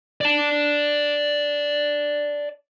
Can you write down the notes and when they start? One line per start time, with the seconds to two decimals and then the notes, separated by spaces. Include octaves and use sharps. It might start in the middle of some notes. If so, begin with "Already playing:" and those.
0.21 D5 A5